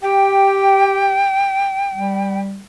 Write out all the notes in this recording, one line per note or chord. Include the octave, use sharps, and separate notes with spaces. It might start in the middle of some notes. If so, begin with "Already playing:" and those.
G4 G5
G3